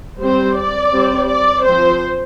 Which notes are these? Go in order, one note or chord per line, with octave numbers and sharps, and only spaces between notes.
G3 C4 C5
D5
G3 C4
D5
F3 C4 C5